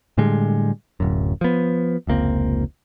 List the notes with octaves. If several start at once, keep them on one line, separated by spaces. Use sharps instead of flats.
A2 D3 G3 G#3
D1 F#2
F3 B3
F1 C#2 A#3 C4